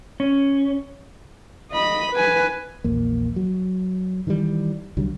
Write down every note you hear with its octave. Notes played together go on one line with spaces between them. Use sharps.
C#4
D#5 B5
B4 G#5
A#1 E2 A#3
F#3
D#3 E3 F#3 G3
C2 D3 F#3 G3